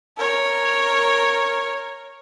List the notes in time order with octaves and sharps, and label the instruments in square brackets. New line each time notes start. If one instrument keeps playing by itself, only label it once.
[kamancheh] A#4 C#5